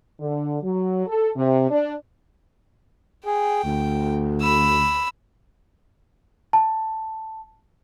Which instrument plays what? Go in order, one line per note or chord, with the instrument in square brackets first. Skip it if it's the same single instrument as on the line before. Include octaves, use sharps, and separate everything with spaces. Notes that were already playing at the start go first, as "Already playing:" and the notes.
[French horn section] D3
F#3
A4
C3
D4
[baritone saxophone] G#4 [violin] G5
[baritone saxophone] D2
[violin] B5 E6
[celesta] A5